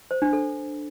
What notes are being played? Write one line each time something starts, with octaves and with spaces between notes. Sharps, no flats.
C5
D4
A4